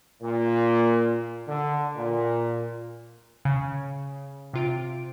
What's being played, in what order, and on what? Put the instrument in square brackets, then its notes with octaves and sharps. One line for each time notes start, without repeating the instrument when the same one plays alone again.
[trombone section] A#2
D3
A#2
[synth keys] C#3
C3 F4 D7